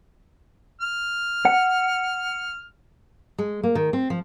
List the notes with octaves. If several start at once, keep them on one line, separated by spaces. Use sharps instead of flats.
F6
F#5
G#3
A#3
D#3
C4
F3